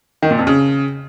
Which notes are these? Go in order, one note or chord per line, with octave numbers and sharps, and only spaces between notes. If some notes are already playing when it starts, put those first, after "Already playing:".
D#3
A#2
F2
C#3